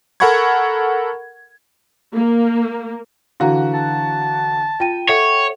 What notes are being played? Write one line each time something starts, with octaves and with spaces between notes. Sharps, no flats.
A4 A#4 F#5 B5 C#6 G#6
A#3
D3 E3 F#4 F5 A#5
A5
F4 G5 D#7
A4 C#5 E5 F#5